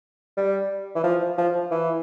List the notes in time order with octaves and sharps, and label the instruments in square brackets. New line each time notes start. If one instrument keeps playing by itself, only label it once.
[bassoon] G3
E3
F3
F3
E3